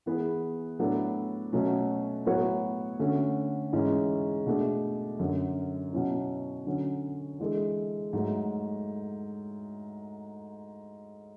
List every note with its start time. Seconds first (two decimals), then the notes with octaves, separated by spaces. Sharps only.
0.06 E3 B3 E4 G#4
0.79 A2 F#3 B3 D4 A4
1.53 B2 F#3 A3 C#4
2.26 A2 F#3 B3 F#4 C#5
2.99 D3 A3 C#4 F#4
3.73 G#2 E3 G#3 C#4
4.46 B2 A3 D4 G#4
5.19 F#2 D3 F#3
5.93 B2 F#3 C#4 E4
6.67 D3 F#3 C#4
7.39 E3 G#3 D4 A4
8.13 G#2 F#3 A3